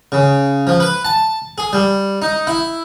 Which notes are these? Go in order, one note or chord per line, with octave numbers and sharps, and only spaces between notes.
C#3
F3
B4
A5
G#4
G3
D#4
E4